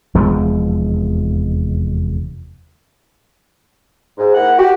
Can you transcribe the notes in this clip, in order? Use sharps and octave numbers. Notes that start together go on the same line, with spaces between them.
F1 E2 F3 G#3
G#2
A#3 E4 F#5
F#4 G4